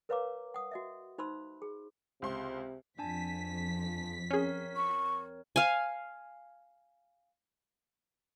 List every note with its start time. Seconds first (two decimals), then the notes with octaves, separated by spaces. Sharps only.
0.09 A#4 B4 C#5 F5 A#5 D6
0.54 F#5 D#6
0.71 F#4 D#5 E5
1.18 D#4 C5 B5 C6 E6
1.62 G#4
2.22 C#2 C3 C5 C6
2.99 F2 D4 G#5 A5 B6
4.31 C4 C#4 G#4 A#4 C#5
4.76 C#6
5.56 F5 G#5